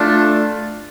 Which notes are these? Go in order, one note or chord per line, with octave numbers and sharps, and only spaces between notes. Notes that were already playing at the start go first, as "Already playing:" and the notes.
Already playing: A3 D4 F4